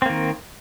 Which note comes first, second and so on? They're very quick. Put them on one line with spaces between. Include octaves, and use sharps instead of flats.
C4 A#3 D#3